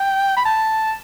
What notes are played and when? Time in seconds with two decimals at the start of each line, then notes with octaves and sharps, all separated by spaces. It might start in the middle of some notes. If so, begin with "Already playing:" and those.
Already playing: G5
0.36 B5
0.45 A5